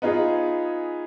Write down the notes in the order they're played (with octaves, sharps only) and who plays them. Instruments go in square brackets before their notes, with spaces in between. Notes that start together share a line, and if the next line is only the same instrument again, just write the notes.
[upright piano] B3 D#4 F4 G#4